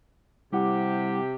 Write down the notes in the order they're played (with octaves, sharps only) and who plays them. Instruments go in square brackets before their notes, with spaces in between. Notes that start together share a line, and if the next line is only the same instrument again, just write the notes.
[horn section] C3 G4 [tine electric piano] G3 E4 F#5